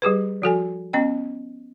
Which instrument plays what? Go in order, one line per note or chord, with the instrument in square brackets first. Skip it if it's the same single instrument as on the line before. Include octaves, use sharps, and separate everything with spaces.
[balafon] G3 G4 G#4 B4
F3 F#4 A4 G#5
B3 C#4 D#5 G5